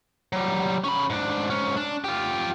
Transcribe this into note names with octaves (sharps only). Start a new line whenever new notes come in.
F#3 G3
C#4 B5
G#2 D4
G#2 C#4
D4
F4 G4